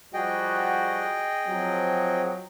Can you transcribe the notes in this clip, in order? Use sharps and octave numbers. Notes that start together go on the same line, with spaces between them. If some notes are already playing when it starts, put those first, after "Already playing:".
F3 G3 F#4 G#4 D#5 G5
F3 F#3 C4